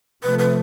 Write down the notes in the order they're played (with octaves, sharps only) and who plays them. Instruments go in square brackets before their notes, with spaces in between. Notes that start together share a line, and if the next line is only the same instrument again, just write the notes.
[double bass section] C3 F3 A3 [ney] B4
[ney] B4